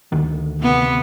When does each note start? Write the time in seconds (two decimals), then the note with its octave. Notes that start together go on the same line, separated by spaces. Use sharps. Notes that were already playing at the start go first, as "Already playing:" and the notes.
0.12 D2 D#3
0.59 C3 B3